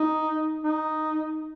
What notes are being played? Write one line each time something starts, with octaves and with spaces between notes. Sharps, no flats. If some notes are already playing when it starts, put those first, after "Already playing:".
Already playing: D#4
D#4